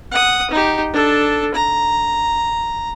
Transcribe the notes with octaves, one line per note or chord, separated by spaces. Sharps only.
F#5 D#6
D#4 G4
D4 A4
A#5